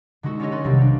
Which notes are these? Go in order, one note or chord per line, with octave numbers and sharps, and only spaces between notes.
D3 G#3 D#4 F#4 A4
C#4 F4 G4 A4 C#5 D#5
A#4 B4 B5 C6 A6
B1 C3 D#3 G3 A#3
C#4 D4